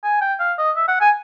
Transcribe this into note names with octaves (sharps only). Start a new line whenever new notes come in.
G#5
G5
F5
D#5
E5
F#5
G#5